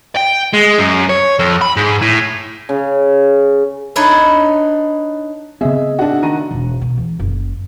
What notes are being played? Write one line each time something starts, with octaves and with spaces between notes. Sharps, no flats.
G5
G#3
F#2
C#5
F2
B5
G#2
A2
C#3
D4 D#4 B4 C#5 D5 E5
C#3 B3 C4 G#4 D#5 E5
D4 F#4
D#3 A#5 D#7
E1
B2
E2
F#1